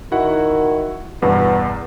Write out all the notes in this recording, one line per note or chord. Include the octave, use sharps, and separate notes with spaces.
D#3 E4 F#4 F#5
E2 G2 B2 B3